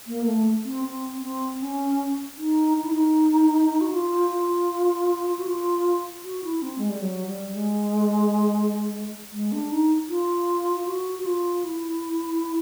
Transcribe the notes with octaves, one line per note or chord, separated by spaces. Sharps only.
A#3
A3
C4
C4
C4
C#4
D#4
D#4
E4
D#4
F#4
F4
F4
F#4
F4
F#4
E4
C4
G#3
G3
F#3
G3
G#3
G#3
D4
D#4
F4
F4
F#4
F#4
F4
E4